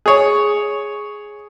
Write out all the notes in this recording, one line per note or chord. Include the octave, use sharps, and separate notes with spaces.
G#4 C#5